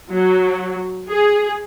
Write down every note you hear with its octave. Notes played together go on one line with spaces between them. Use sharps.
F#3
G#4